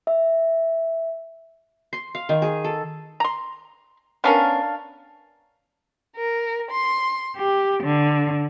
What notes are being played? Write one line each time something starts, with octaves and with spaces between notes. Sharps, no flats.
E5
C6
F5
D#3
G#4
A4
A#5 C6
B3 C#4 D4 A#4 F5 F6
A#4
C6
G4
D3